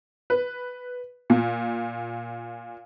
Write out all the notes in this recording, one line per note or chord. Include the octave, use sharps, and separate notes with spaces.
B4
A#2